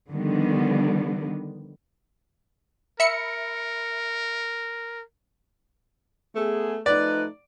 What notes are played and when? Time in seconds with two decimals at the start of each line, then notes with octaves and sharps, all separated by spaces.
0.11 D3 D#3 F3 G3 B3
3.00 A#4 E5 B5 C#7
6.35 A3 B3 G#4
6.86 F3 A3 D#4 B4 D5